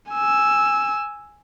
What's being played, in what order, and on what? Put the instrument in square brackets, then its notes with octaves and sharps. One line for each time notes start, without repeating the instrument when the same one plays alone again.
[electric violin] G#5 E6